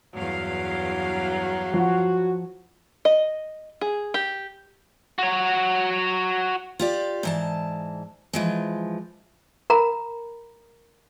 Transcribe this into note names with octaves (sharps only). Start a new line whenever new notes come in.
E2 G2 F#3 F5
F3 F#4
D#5
G#4
G4
F#4 C#5
F4 G4 D5
G#2 E3 A5
E3 F3 G#3
A#4 A#5 B5